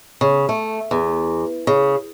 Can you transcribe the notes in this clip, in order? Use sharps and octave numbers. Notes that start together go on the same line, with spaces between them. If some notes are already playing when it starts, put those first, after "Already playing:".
C#3
A3
E2
C#3